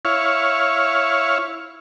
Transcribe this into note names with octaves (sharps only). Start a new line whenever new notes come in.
E4 C#5 F5